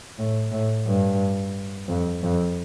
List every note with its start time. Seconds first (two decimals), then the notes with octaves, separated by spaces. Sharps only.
0.18 A2
0.51 A2
0.87 G2
1.88 F2
2.23 F2